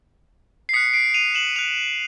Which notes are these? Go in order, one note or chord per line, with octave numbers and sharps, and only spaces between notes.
C7
D#6 F#6 B6 C#7
C7 D7
D#7 F7
E7 F#7
D#6 F#6 D#7 F7